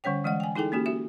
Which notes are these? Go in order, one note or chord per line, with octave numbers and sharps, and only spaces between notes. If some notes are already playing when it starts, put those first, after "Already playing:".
D3 G3 C#4 C#5 G5
E3 G#3 D#5 F#5
G5 G#5
D#4 E4 G#4 A4 G5
A#3 C#4 F#4 G4
F#4 E5